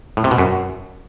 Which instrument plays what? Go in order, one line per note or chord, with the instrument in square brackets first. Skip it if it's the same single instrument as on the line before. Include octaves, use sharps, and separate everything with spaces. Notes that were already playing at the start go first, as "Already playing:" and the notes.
[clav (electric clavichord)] A2
C3
B2
F#2